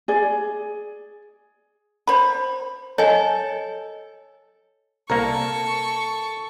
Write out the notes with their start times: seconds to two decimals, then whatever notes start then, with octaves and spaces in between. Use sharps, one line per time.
0.08 G#4 D5
2.07 C5 B5
2.98 A4 C#5 D#5 G#5
5.10 C2 A#3 A4 A#4 C#6